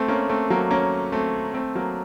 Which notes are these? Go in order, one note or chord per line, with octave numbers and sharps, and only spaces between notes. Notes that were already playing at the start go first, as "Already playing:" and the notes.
Already playing: A3 C4
A#3 C#4
A3 C4
F#3 A#3
A#3 C#4
A3 C4
A3 C4
F#3 A#3